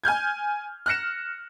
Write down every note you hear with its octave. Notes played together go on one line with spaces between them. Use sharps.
G#5 F6 G6 G#6
F6 F#6 A#6 C#7 E7